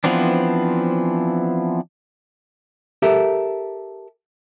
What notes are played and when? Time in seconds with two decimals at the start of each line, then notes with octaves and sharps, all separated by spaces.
0.04 E3 F3 B3 C4 D4
3.02 G4 A4 A#4 E5